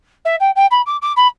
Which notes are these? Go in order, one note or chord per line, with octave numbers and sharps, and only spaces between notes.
E5
G5
G5
B5
D6
D6
B5